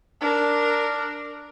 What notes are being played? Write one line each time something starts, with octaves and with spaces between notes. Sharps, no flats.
D4 A#4